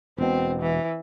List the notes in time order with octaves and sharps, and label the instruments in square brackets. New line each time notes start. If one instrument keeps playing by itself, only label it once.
[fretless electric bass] E1 B2 [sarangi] C4
[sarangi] E3